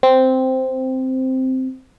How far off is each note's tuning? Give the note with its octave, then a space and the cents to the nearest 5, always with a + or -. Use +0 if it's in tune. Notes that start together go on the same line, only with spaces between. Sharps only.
C4 -5